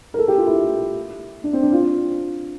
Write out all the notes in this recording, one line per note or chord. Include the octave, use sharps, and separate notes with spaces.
A#4
A4
G4
F4
E4
D4
C4
D4
F4